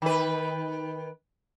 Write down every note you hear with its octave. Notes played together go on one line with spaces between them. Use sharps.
D#3 B4